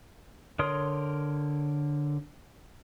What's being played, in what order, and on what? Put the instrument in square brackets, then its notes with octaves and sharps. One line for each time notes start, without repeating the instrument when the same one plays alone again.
[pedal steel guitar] D3 A#4 C#5 C6 D#6